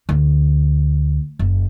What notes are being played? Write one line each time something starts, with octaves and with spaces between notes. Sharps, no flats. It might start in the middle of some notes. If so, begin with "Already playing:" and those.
D2
F#1